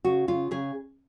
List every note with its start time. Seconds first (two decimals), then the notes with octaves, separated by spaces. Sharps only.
0.05 C#3 F#4
0.28 C#3 F4
0.51 C#3 G#4